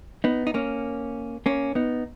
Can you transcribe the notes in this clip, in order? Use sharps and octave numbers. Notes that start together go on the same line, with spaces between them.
B3 D#4
D#4
A#3 C#4
A#3 C#4
B3 D#4